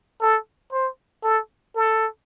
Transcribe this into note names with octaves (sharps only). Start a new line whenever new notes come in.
A4
C5
A4
A4